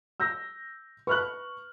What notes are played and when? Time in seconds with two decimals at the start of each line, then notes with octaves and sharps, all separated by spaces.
0.20 E6 G6 A#6
1.07 B4 C#6 F6 F#6